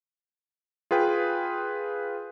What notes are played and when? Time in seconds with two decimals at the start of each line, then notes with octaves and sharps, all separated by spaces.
0.91 F4 G#4 B4 G5